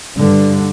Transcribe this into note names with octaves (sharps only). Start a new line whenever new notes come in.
G2 D3